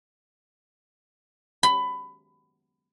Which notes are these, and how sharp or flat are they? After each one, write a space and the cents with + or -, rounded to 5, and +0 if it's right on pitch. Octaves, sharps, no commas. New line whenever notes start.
B5 +20